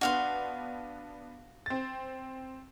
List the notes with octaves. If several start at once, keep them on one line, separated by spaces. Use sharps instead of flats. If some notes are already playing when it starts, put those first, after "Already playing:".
B3 D4 F#4 F5 C6
C4 A6